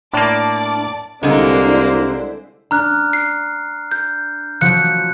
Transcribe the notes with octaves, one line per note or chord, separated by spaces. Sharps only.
A2 A#3 D4 D5 A5 D6
C2 D3 G#3 A#3 D4 E4 C5
D4 A#5 F6 F#6
C7
G6
F3 F#3 F4 F#6 C#7